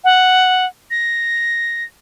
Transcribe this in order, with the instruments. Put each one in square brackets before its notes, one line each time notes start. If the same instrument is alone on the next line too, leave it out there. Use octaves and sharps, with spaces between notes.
[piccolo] F#5
A#6